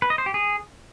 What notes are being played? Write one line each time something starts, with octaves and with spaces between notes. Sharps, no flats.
B4
D#5
C5
G4
G#4